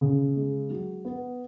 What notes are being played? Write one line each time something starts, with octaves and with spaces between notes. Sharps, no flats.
C#3
G#3
F#3
B3